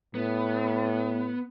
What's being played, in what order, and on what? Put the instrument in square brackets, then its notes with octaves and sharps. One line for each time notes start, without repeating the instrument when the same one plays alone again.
[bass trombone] A2 [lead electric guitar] B3